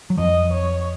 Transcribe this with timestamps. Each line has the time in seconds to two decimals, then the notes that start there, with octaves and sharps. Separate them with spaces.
0.10 F#3
0.17 F2 F3 D#5
0.53 C#5